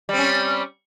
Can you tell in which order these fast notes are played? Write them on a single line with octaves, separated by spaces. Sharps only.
G3 C4 C#4